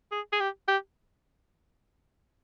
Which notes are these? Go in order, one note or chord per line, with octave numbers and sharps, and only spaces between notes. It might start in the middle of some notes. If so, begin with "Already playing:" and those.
G#4
G#4
G4
G4